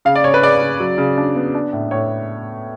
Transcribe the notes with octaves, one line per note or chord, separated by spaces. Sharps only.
C#3 F5
D5
C#3 C#5
B4
C#3 D5
C#3
F#3
C#3
D4
B3
D4
A2
A2 C#5